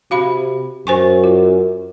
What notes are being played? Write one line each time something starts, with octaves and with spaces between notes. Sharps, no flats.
C3 F#4 F5 B5
F#2 C5 G#5 C#6
F4